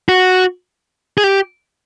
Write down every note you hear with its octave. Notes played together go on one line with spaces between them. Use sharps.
F#4
G#4
G4